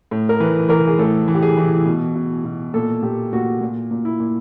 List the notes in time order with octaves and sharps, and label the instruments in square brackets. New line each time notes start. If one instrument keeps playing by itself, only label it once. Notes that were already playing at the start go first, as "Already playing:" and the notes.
[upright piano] A2
A#4
E3 B4
E3 A#4
G#4
A2 A4
E3
G4
G#4
E3
B2
B2
B2
A#2 A4
A#2 G4
A#2 F#4
A#2
A#2
E4
A#2